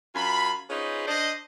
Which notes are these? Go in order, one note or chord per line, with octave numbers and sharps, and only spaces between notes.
F#2 F4 G#5 B5
C#4 D#4 F4 G#4 B4 C5
D4 C5 D5 D#5